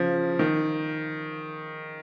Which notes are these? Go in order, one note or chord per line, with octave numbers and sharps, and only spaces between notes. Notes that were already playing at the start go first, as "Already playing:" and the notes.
Already playing: C#3 F3
D#3